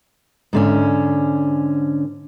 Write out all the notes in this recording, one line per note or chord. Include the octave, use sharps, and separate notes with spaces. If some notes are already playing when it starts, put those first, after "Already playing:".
G#2 D3 C#4